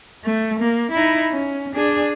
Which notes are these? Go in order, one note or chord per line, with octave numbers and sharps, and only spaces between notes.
A3
A#3
D#4 E4
C#4
D4 G#4